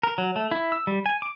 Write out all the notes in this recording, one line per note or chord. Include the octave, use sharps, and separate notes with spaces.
A#4
F#3
A3
E4
E6
G3
G#5
D6